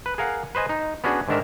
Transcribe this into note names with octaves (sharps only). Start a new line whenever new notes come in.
B4
G#4 A#4 F5 F#5
B4 C5 D#5 G#5
D#4
B3 C#4 D4 F#4 G#4
G#2 D3 D#3 D4 A#4 E5